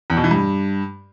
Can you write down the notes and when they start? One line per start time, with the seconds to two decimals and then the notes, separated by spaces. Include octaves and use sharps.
0.10 E2
0.17 B2
0.24 E3
0.31 G2